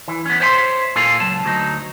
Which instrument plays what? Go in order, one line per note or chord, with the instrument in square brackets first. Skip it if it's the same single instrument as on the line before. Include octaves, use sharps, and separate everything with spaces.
[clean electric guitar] E3
B3 C#4
C5 C#5 E5 G#5 C6
A#2 F4 A4 F5 G#5
C#2 F#3 A5
D2 F#3 D#4